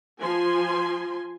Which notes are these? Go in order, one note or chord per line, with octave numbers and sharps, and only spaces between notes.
F3 G#5 C6